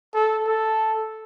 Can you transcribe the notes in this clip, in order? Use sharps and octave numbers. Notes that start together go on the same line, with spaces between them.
A4
A4